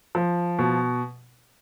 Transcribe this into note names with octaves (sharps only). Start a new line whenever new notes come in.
F3
B2